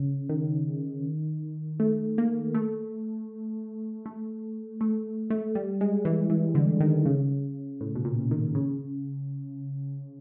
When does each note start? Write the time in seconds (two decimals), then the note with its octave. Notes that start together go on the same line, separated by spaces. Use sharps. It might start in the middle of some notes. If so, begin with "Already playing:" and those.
Already playing: C#3
0.29 D#3
1.80 A3
2.18 A#3
2.54 A3
4.06 A3
4.81 A3
5.30 A3
5.55 G3
5.81 G#3
6.05 E3
6.30 E3
6.55 D3
6.80 D#3
7.05 C#3
7.81 A2
7.95 B2
8.05 A#2
8.31 D#3
8.55 C#3